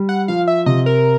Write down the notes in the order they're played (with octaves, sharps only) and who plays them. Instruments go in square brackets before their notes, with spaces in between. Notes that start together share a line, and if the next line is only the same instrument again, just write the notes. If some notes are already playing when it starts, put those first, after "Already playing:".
Already playing: [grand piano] G3
[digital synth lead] F#5
[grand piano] F3 [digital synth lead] F5
[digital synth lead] E5
[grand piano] C3 [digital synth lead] D#5
[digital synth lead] A#4